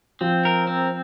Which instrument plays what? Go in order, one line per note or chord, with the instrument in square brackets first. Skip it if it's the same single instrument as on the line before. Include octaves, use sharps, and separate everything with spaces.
[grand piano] F3 [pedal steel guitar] C4
[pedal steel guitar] A#4
C4